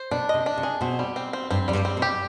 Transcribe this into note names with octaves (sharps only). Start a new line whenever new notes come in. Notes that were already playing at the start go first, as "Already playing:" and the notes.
Already playing: C5
B2 D4
C3 D#5
D4
C3
G#4
B2 C4
G3
C4
C4
G2 C4
F2 G3
G2
C4
B2
G4